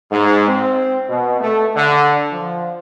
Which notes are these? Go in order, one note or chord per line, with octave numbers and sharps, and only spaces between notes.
G#2
C4
B2
A3
D3
F3